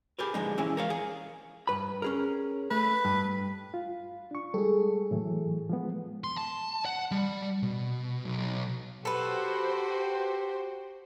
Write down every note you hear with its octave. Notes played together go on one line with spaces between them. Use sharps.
G4 G#4 A#4 B4
D3 F3 G#3 D#4
E3 G#3 C#4 E4
A#4 C#5 F5
G#4
G2 B4 B5
C#4 G#4 A#4
A3 B4
G2
F4
D4 C#6
G3 G#3 G#4 A4
A2 E3 F#3
F3 G#3 B3
C6
A5
F#5
G3
B2
B1
F#4 G4 A4 B4 C5